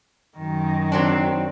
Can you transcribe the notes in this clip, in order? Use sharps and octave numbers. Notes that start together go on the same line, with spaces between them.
F#2 D#3
F#3 C4 D4